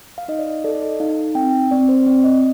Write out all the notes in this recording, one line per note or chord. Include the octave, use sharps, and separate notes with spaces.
F5
D#4 D#5
D5
D#5
A4 D5
D#5
D#4 F5
C4 G5
C4 D5
C5
C4 D5
D#5